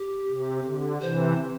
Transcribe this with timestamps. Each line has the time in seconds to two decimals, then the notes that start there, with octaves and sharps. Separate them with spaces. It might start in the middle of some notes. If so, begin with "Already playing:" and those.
Already playing: G4
0.27 C3
0.65 D3
1.01 C3 E3 C5